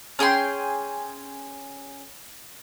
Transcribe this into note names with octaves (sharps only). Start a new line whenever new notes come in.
C#4 G#4 G5 C6